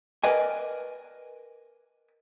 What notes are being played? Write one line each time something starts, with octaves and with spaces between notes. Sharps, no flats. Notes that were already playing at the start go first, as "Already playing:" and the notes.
A#4 B4 D5 D#5 G#5